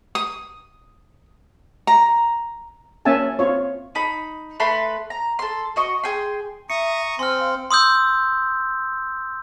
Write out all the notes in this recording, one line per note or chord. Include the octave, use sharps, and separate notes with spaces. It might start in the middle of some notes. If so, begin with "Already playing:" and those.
D#6
A#5
A#3 C#4 E5 F#5 G#5 A5
C4 F4 C#5
D#4 B5
A3 B4 B5 C6
A#5
A4 C6
F#4 D#5 C#6
G#4 G5 C6
E5 A#5 C#6 D#6 C#7
C4 G#5 C6 F6
F5
C6 D#6 E6 G6